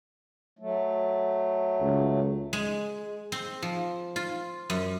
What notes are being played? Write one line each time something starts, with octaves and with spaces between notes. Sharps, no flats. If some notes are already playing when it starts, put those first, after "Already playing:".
F#3 A3
C#2
G#3
C4
F3
F4
F#2